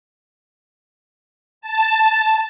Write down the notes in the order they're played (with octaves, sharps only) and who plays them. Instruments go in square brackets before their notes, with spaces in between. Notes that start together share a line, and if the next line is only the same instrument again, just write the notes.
[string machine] A5